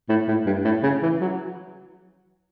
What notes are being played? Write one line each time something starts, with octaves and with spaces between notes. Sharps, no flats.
A2
A2
G2
A2
C#3
E3
F#3